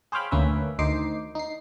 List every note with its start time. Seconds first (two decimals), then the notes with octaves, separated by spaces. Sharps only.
0.12 G#4 C5 C#5 F5 G5 B5
0.31 D2 A#3 C#4 B4 E5
0.79 D2 D#3 D#4 C5 D6 C7
1.35 D#4 C7